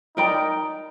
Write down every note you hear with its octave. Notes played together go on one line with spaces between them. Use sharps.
D#4 A#4 D5 G5 A#5